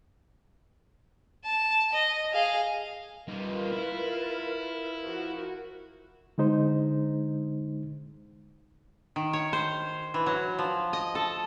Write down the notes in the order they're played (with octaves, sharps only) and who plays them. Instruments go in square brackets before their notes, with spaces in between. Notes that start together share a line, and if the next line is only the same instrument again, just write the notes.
[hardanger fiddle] A5
D#5
G#4 F5
[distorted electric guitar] G3 D#4 [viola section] F4 A#4 B4
[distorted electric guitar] E4
[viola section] F3 F#4 A#4
[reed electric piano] D3 G#3 D#4 C5
[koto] D#3
C#5
C5
E3
F#3
F3
D#5
A4